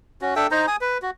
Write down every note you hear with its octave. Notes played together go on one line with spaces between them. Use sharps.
C#4 F#4
D4 A4 E5 G5
D#4 C5 A#5
G#5 D#6
B4
F#4